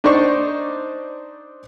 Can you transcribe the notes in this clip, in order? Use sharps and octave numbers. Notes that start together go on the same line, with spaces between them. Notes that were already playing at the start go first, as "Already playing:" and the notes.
D4 D#4 C5 D5 C#6